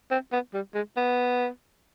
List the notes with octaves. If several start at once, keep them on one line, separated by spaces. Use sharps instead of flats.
C4
B3
G3
G#3
B3